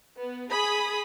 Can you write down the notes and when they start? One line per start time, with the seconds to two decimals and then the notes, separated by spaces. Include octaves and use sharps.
0.19 B3
0.50 G#4 B5 D#6